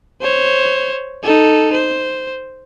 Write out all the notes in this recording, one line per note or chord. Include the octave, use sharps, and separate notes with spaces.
C5 C#5
D#4 A4
C5